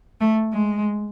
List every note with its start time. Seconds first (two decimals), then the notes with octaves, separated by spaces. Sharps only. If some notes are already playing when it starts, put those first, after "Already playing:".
0.20 A3
0.53 G#3